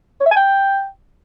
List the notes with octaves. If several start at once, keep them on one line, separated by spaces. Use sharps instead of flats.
C#5
E5
G#5
G5